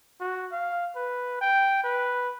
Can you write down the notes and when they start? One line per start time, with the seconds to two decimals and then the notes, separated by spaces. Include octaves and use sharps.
0.21 F#4
0.52 F5
0.96 B4
1.41 G5
1.83 B4